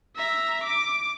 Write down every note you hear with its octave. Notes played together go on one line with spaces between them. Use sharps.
E5 A#5
D6